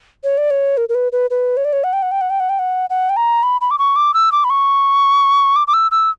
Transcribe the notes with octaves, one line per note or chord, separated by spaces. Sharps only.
C#5
D5
C#5
A#4
A#4
B4
B4
B4
C#5
D5
C#5
F#5
G5
F#5
G5
F#5
G5
F#5
G5
F#5
F#5
G5
A#5
B5
B5
D6
C#6
D6
E6
D6
B5
C#6
D6
D6
E6
E6